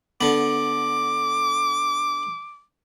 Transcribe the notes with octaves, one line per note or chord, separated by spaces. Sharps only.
D3 B3 D6